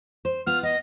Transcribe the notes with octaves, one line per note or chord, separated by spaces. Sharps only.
C5
B3 F4 F6
B3 D#5